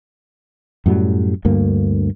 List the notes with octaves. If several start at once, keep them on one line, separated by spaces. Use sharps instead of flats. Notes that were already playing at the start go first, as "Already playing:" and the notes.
F#2 A2 F#3 G3
D2 G2 A#3